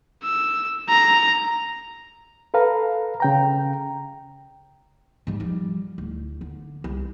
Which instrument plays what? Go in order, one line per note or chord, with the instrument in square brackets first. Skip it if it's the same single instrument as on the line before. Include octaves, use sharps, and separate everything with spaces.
[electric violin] E6
A#5
[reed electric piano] A4 B4 F5 A#5
C#3 G5 A#5
[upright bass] G#2 G3
F3 G3
D1
D3
C2